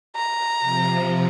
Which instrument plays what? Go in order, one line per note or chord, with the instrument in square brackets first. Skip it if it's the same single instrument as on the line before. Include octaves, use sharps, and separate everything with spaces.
[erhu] A#5
[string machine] C3 F3